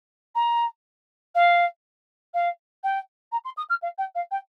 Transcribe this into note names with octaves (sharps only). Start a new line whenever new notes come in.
A#5
F5
F5
G5
A#5
C6
D#6
F6
F5
G5
F5
G5